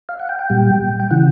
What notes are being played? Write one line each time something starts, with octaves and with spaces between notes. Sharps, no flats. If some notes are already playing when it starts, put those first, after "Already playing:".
F5
F#5
G5
G5
A#2 G3
G5
C#3 E3 F#5